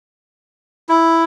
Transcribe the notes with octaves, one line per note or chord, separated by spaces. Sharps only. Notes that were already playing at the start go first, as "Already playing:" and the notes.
E4